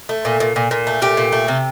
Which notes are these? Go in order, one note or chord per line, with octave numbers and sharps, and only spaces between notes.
A3
A#2
A#2
A#2
A#2
A3
A#2 G4
A#2
A3
C3